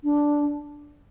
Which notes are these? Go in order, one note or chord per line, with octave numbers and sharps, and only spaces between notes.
D4